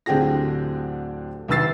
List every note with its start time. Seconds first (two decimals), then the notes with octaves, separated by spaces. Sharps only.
0.06 D1 D3 C4 G4 G#4 A#6
1.48 C2 D#3 B4 E6 A6 C7